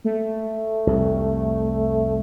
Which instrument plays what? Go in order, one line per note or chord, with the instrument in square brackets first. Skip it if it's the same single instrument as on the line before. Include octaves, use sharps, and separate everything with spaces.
[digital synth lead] A3
[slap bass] C2 F2